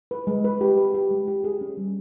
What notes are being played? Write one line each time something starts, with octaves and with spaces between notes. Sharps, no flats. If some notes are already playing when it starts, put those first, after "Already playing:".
B4
G#3
B4
G4
B4
G4
G#3
G4
G#4
C#4
G3